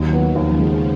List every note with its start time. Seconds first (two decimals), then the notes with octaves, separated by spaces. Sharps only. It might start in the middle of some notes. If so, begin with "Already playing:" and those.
Already playing: D#2 D#3 F#3
0.13 B3
0.35 D#2 C#3 F3
0.59 G#3